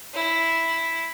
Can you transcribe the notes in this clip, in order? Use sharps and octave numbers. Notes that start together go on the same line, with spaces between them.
E4